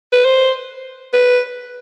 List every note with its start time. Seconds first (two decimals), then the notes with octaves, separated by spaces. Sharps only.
0.13 B4
0.25 C5
1.13 B4